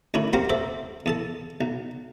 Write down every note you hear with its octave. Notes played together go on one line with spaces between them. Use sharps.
D2 D#3 C#4 E4
F#3 A#3 C4 G4 A#4 C5
A4 C5 D5 E5
E2 A4 A5
B1